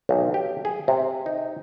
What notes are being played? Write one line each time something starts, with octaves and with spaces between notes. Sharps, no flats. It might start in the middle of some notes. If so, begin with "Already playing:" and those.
B1
G4
G#4
C3
D#4